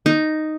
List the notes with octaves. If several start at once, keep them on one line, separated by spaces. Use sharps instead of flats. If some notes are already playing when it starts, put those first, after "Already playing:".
D#4